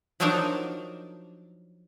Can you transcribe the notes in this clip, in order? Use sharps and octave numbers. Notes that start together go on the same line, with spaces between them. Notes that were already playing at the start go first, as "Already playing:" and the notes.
F3 F#3 D4 D#4 A#4 A5